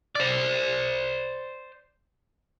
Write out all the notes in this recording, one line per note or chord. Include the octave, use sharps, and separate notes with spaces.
C5 D5